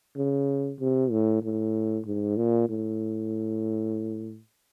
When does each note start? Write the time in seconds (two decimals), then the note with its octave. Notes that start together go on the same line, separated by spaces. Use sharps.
0.17 C#3
0.80 C3
1.11 A2
1.43 A2
2.06 G#2
2.37 A#2
2.69 A2